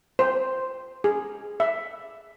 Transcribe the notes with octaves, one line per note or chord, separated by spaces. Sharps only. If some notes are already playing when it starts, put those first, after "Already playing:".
C5
G#4
E5